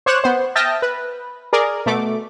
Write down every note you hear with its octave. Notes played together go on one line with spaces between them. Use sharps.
C5 C#5 D6 F#6 E7
B3 C5
E5 G5 A5 D#6 F6 A#6
B4
G#4 A#4 D5
B2 A3 D6